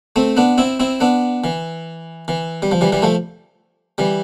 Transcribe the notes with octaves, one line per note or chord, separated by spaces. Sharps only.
A3 C4
B3 D4
C4 E4
C4 E4
B3 D4
E3
E3
G3
F3
E3 G3
E3 G3
F3 A3
E3 G3